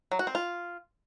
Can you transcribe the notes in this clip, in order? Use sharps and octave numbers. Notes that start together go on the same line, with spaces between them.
F#3
F#4
C4
F4